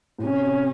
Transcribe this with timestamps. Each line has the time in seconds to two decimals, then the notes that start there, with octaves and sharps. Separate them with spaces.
0.18 A2
0.23 C3 C#4
0.43 C3